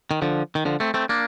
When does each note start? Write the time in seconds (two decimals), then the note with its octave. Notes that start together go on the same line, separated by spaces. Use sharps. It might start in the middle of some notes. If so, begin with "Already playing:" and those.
0.11 D#3
0.22 D3 F3
0.55 D#3
0.65 D3 F3
0.80 A3 C4
0.94 A3 C4
1.09 A#3 D4